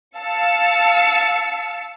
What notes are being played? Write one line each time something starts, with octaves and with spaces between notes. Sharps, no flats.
F5 A5 E6 C#7